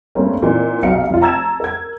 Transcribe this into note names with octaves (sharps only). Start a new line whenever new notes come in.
G2 A3 A#3 C4 C#4
A#2 E3 C4 D#4
B1 C3 F#3 F5 F6 C#7
F1 F4
A5 A#5 E6 G#6 A6 E7
A#4 G#6